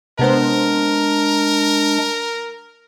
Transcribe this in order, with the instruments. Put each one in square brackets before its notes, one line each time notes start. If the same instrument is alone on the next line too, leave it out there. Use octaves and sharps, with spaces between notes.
[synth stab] C3 B3 C5 [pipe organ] G#3 D4 [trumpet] A#4